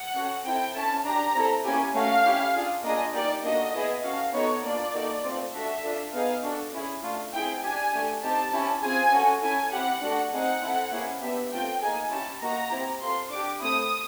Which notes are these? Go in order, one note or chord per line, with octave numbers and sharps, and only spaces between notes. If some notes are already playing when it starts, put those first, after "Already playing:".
Already playing: F#5
C#4 F#4 A4
C4 E4 A4 G5
C#4 E4 A4 A5
D4 G4 A#5
C4 E4 A4
A#3 C#4 E4 G4 G#5
A3 C#4 F#4 A4 F5
C#4 E4 G4
D4 F4 G#4
A#3 D4 F4 G#4 D#5
A#3 D#4 G4 D5
A#3 D4 F#4 A4 D#5
B3 E4 G#4
C#4 F#4 A4 F5
B3 D#4 F#4 A4 C#5
A#3 D4 F4 D5
A#3 D#4 F#4 A4
A3 C4 F4
D4 F#4 A4 E5
D4 F4 A4
B3 D#4 G#4 F5
D4 F#4 A4
C#4 E4 G#4
A3 D4 F4
C4 E4 G#4 G5
D4 G4 G#5
A3 D4 G4
C4 D#4 G4 A5
C#4 E4 G4
C4 F4 G#4 G#5
C#4 F#4 A4
C#4 E4 A4 G#5
C4 E4 G4 F#5
A3 D4 F#4 A4
C4 D#4 G#4 F#5
C4 E4 A4
A#3 C#4 E4 G#4
B3 D4 G4 E5
A3 C4 F4 G5
A#3 D#4 G#4 G#5
C#4 E4 G4 A5
A#3 D#4 F#4 A#5
C4 E4 G4
C4 F4 A4 C6
D4 G4 D6
A3 C4 E4 D#6